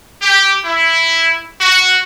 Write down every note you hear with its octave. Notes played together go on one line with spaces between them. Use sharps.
G4
E4
F#4